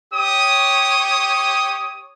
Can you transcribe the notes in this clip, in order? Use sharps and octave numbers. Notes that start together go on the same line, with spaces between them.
G4 C#5 D#6